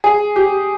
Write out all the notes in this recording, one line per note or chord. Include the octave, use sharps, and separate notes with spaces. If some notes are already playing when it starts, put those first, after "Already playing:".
G#4
G4